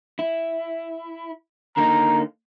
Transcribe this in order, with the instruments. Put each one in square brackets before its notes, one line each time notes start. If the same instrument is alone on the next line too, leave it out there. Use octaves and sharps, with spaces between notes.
[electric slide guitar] E4
[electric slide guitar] D3 A#3 D#4 [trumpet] A#5